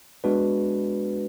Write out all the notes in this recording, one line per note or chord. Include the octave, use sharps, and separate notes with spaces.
G#3 B3 D4 F#4 B4